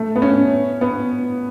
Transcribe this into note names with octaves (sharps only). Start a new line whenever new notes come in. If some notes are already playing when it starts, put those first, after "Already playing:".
Already playing: A3
B3
C#4
B3